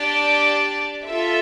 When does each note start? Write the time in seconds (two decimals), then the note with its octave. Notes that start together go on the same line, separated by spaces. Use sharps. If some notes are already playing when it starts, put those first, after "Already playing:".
Already playing: D4 G4 D5 A5
1.05 F4 A4 E5